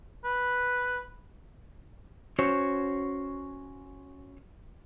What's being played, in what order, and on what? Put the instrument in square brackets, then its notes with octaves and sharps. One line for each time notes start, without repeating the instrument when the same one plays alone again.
[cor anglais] B4
[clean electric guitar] C#4 F#4 C5 C#5